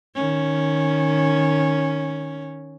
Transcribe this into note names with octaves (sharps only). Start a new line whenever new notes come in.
D#3 C#4